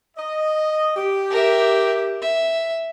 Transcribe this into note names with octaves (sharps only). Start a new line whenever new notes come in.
D#5
G4
A#4 E5
E5